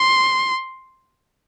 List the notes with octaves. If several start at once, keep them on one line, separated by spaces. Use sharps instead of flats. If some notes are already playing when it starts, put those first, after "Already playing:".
Already playing: C6